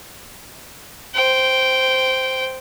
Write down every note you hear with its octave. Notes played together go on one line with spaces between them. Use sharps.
C5 G5